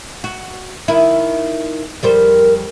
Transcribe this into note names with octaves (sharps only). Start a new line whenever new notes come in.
F#4
D#3 E4
F2 G3 A#4 C5